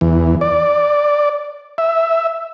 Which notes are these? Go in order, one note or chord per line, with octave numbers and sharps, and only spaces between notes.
E2
D5
E5